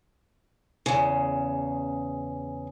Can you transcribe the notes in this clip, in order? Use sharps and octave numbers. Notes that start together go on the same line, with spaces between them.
E2 C#3